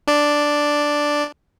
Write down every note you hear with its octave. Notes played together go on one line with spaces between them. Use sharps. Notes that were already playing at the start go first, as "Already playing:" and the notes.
D4 D5